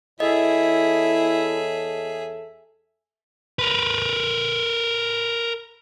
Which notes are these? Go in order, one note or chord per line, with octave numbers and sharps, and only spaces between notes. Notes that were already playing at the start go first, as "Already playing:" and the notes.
E2 E4 G#4 A4 C#5 D#5 E5
A#4 B4